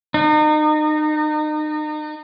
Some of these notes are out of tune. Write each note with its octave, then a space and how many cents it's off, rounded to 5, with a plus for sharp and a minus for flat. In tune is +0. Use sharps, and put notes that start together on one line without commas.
D#4 -35